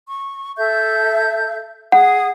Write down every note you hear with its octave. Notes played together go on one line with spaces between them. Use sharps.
C#6
A4 E5 G6
G#4 F#5 D#6